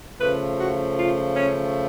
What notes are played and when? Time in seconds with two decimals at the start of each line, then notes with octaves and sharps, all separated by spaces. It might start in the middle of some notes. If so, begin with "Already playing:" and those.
0.20 C#3 F3 A3 B4
0.58 F#4
0.97 F4
1.35 C#4